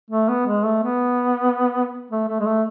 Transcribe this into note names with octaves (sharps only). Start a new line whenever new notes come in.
A3
B3
G#3
A3
B3
A3
A3
G#3
A3